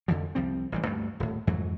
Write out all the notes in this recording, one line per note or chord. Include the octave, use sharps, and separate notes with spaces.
F2 D3 E3 F3
C2 F3 G3 C4
A1 E3 G3
D2 G2 G3 A3
D#1 A2
F2 G#2 E3 F#3